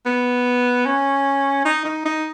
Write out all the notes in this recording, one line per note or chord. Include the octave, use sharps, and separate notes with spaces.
B3
C#4
D#4
D#4
D#4